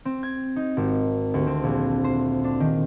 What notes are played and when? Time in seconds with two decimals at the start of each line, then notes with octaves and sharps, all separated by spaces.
0.05 C4
0.23 G#6
0.56 D#4
0.77 G#1
1.34 D2
1.47 C4
1.64 A#1
2.04 C5
2.44 D4
2.60 D#3